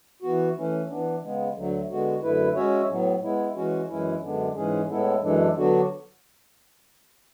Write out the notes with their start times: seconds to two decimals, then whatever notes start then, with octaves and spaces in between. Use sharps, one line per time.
0.22 E3 B3 F#4
0.56 E3 A3 C#4
0.89 E3 B3 D4
1.22 C#3 G#3 B3
1.56 D2 D3 F#3 A3
1.89 D3 G#3 B3 F#4
2.22 F#2 D3 A3 E4 B4
2.55 G#3 C#4 F#4 C#5 E5
2.89 A2 F#3 B3
3.22 G#3 B3 E4
3.55 E3 G#3 C#4 F#4
3.88 F#2 E3 G#3 C#4 E4
4.21 F#2 D3 G#3 B3 D4
4.55 G#2 E3 G#3 C#4 G#4
4.89 A2 G#3 B3 E4 A4
5.21 F#2 E3 G#3 D4 A4
5.55 D3 F#3 B3 D4 F#4